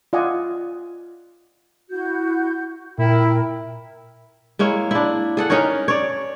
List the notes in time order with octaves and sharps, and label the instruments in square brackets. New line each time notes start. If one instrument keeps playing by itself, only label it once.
[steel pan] F4 D5 D#5 F#5 G#5
[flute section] E4 F#4 G6
[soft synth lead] A#2 [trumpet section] E4 [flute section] A#4 G5
[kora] G#3 A#3 E4 C#5
D4 E4
G#4 A4 F#5
C#4 D#4 A#4 C#5
C#5 D5